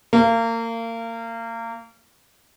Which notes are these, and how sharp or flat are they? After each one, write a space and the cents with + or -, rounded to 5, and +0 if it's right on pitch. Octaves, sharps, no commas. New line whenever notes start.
A#3 -30